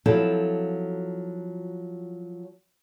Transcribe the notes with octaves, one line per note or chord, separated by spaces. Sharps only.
F3 F#3 C4 E4 A4